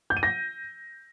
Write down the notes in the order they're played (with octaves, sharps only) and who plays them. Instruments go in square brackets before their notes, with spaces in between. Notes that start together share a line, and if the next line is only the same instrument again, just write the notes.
[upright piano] G6
D#7
A#6